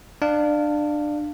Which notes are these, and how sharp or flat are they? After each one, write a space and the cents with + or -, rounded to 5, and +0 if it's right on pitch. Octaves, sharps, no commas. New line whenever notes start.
D4 +20 F5 +0